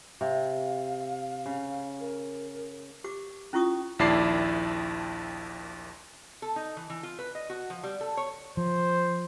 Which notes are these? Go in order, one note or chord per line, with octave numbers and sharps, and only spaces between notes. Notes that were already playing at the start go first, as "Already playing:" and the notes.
C3 F5
C#3
A#4
G4 D6
C#4 E4 F4 C#6 D#6
A#1 D#2 E4 D5 A5 C7
A4
D#4
E3
E3
F4
B4
D#5
F#4
F3
G3
A4
C#5
F3 C5